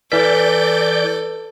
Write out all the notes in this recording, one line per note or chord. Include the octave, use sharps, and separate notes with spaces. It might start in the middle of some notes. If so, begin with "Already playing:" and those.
E3 A4 B4 D5 G6 B6